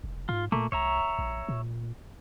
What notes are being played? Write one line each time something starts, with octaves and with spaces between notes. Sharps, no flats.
F1
G#2 F4
A#2 A3 A#3
C2 C#5 E5 A#5
A#1
A#2